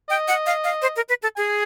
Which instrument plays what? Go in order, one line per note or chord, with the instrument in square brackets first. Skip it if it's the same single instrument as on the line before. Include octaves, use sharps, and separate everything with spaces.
[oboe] D#5 [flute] G5
[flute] F#5
F5
F5
C5
A#4
B4
A4
[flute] G#4 [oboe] G#5